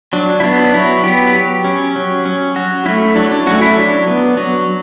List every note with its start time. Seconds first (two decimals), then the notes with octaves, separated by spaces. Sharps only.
0.13 F#3 D4
0.40 E4
0.44 B3 D4
0.74 F#3 E4
1.04 B3 G4
1.35 F#3
1.64 C#4
1.96 F#3
2.25 C#4
2.56 F#3 F#4
2.85 A3 C#4 E4
3.16 F#3 D4
3.31 D4
3.47 A3 C#4 F#4
3.62 E4
3.77 F#3 D4
4.08 B3
4.37 F#3